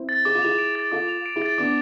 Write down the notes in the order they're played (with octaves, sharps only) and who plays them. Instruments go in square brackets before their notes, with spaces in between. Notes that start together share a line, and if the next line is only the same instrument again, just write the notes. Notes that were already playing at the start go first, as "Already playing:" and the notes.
Already playing: [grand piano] C4 E4
[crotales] A6
[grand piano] G#4 [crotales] D6
[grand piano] F4
[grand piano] E4 G#4 [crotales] F7
[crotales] D7
A6
[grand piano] F4 A4 [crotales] D6
[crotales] F7
D7
[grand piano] E4 G#4
[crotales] A6
[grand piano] B3 D4 [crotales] D6